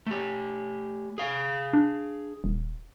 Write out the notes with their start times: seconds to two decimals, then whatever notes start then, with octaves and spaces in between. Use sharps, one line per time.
0.07 A3 G4
1.18 G#4 F5
1.73 D4
2.44 D#1